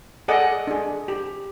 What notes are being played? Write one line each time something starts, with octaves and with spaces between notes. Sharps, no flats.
G#4 A4 D5 D#5 F#5
D4 G#4
G4